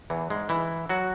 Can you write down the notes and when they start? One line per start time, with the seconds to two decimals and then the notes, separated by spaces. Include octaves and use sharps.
0.10 E2 E3
0.30 G#2 G#3
0.49 E3 E4
0.89 F#3 F#4